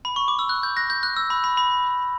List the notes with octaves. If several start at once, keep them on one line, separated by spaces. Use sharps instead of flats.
B5
C#6
D6
E6
F#6
G6
F#6 A#6
G6
F#6
E6
B5
B5
B5